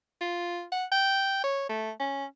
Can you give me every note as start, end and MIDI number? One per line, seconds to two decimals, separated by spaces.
0.21 0.65 65
0.72 0.85 78
0.92 1.40 79
1.44 1.68 73
1.69 1.91 57
2.00 2.25 61